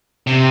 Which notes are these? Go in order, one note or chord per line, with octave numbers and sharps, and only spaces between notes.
C3